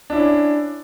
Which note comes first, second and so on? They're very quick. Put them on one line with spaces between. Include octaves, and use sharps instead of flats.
D4 E4 C#4